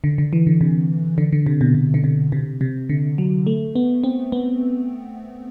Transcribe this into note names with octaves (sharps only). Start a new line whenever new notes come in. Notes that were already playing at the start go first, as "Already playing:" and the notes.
D3
D3
E3
D3
C3
D3
D3
C3
B2
B2
D3
C3
C3
C3
D3
F#3
A3
B3
C4
B3